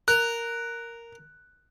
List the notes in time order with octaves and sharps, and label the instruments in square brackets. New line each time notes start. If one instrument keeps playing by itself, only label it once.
[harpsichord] A#4 [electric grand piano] F#6